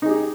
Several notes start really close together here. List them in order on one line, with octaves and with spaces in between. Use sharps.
D#4 G#4 G4